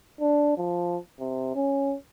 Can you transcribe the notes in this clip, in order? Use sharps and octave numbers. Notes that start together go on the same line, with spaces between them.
D4
F3
C3
C#4